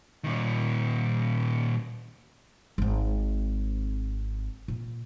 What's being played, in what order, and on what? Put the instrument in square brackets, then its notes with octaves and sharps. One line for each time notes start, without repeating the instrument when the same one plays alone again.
[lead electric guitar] A#2 D#3
[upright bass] G#1 C4
A#2